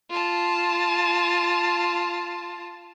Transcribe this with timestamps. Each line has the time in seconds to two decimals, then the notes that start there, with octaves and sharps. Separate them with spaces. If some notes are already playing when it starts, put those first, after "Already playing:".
0.10 F4 A5